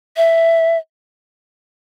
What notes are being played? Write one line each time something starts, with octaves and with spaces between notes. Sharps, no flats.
E5